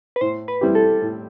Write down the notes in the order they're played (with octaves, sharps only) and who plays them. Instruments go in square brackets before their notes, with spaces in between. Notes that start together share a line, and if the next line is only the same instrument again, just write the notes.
[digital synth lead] B4
[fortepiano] A2 [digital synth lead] C5
[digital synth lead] B4
[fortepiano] G3 C4 E4 G4
[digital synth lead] A4
[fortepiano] A2